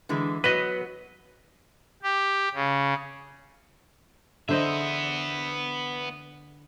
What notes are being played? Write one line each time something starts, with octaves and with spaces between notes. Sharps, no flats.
D3 E3 G#3
F#3 B3 B4 D#5
G4
C#3
D3 B3 C5 D#5 E5